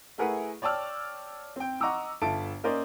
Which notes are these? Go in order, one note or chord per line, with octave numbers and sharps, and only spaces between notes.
A3 E4 G#4 A#4 B4 F#5
C#5 D5 G5 A5 E6 F6
C4 G5
D#5 F#5 A#5 C#6 D6 E6
G1 F4 A4 E5 A5 D7
A#3 C#4 A#4 C5 D5 D#5